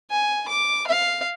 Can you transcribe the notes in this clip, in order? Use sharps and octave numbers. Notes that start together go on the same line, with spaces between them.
G#5
D6
F5